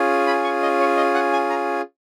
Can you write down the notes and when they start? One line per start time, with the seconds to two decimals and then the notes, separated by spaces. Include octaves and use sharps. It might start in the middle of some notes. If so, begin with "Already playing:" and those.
Already playing: C#4 F4 G#4
0.27 B5
0.44 C#6
0.62 D#5
0.79 C#5
0.97 D#5
1.14 F#5
1.33 G#5
1.50 A#5